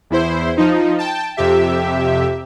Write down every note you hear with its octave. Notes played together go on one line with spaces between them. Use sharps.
E2 E4 C5
F3 D#4
G5 A5
F2 C3 G4 E5